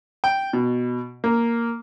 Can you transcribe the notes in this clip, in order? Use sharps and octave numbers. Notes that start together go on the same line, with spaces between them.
G5
B2
A#3